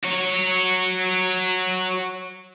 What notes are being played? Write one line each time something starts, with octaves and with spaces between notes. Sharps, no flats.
F#4 C#5